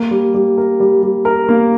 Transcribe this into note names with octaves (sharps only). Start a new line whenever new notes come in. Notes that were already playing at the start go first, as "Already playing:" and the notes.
Already playing: A#3
G3
G3
A#4
G3
G3
A#4
A#3